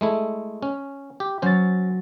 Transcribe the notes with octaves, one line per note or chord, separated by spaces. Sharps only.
G#3 A3 E4
C#4
G4
F#3 C#4 C5 A6